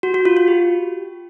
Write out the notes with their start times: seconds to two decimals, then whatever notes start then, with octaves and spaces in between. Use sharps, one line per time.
0.03 F#4
0.14 F#4
0.25 F4
0.37 F4
0.48 G4